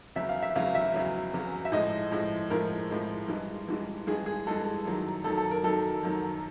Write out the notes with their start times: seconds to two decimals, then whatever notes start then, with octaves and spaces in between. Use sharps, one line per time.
0.16 E2 C#3 F#3 E5
0.29 F5
0.43 E5
0.55 E2 C#3 F#3 F5
0.75 E5
0.94 E2 C#3 F#3
1.34 E2 C#3 F#3
1.65 E5
1.72 A2 F3 G#3 D#5
2.12 A2 F3 G#3
2.50 A2 F3 G#3 A#4
2.90 A2 F3 G#3
3.28 G2 E3 G#3
3.69 G2 E3 G#3
4.07 G2 E3 G#3 G#4
4.26 G#4
4.47 G2 E3 G#3 A4
4.85 F#2 D#3 F#3
5.24 F#2 D#3 F#3 A4
5.37 A4
5.51 A#4
5.63 F#2 D#3 F#3 A4
6.03 F#2 D#3 F#3